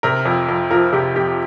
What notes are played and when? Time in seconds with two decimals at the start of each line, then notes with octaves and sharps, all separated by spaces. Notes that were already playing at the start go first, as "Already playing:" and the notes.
0.03 C3 A#4
0.25 F2
0.48 F2
0.71 F3 A#4
0.93 C3 G4
1.15 F2 G4